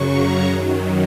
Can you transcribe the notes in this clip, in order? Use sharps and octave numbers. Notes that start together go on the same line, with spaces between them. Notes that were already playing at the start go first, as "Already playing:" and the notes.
Already playing: F#2 C#3 F#3 C#6
A#5
F#2 D#3 F#3